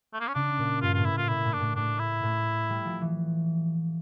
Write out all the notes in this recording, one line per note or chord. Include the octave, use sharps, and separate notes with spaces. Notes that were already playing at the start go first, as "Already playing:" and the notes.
A3
A#3
C#4
C#3 D4
A#2
G2 F4
A2 F4
E4
A2 F4
A#2 E4
A2
D4
A2
A2 D4
E4
A2
G3
F3
E3